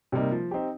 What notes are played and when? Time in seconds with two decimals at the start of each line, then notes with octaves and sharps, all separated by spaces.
0.12 C3 G3 A#3 D#4
0.32 F3
0.51 C4 D#4 G4